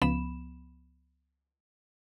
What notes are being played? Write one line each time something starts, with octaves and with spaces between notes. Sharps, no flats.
C#2 F3 B3 B5 E7